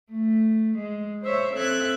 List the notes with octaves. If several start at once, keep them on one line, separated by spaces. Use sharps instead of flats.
A3
G#3
C5 C#5 E5
C4 A4 E5 F#6 G#6